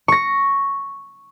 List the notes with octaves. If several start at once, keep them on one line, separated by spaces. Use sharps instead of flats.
C#6 A#6